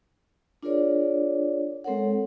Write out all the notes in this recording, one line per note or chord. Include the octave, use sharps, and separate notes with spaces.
D4 F4 G#4 A#4 C#5 D5
G#3 C4 A4 A#4 C#5 F#5